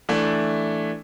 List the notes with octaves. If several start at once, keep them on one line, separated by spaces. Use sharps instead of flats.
E3 A3 D4